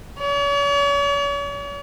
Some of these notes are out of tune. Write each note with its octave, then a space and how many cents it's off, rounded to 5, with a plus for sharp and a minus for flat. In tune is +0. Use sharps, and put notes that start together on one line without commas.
C#5 +45